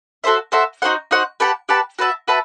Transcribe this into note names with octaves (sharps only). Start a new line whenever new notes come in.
F#4 A4 C5 E5
F#4 A4 C5 E5
D#4 F#4 C5 F#5
D#4 F#4 C5 F#5
G4 B4 F#5 A5
G4 B4 F#5 A5
F#4 B4 E5 A5
F#4 B4 E5 A5